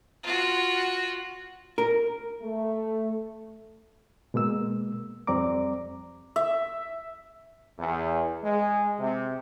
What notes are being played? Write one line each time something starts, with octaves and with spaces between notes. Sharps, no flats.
F4 F#4
A#4
A3
B2 G#3 A#3 E6
F2 G3 C4 D5 A#5 D6
E5
E2
G#3
C3